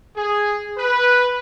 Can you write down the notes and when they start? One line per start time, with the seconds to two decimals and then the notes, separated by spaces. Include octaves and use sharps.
0.16 G#4
0.77 B4